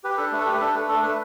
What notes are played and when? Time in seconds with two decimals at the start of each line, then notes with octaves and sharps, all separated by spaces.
0.04 G4 B4
0.18 D4 A4
0.32 A3 B4
0.40 A4
0.46 G4 B4
0.60 D4 A4
0.74 A3 B4
0.89 D4 A4
1.03 A3 B4